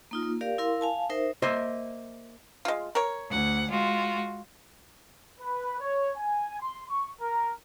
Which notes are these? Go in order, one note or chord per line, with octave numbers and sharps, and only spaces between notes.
A#3 D#4 F4
A#3
G4 A#4 D5 F5
E4 A#4 F5 C6
F5 G#5 A5
D#4 A#4 C5 E5
A#3 C5 D#5 E5
G#3 F4
A#4 C#5
D2 F#5
G#3 F4 F#4
B4
C#5
G#5
C6
C#6
A#4